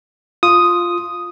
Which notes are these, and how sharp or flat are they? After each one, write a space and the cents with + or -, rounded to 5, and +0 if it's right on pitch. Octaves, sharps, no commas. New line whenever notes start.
F4 +0 D#6 +0